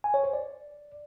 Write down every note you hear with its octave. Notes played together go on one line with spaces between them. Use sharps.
G#5
C#5
C5
D5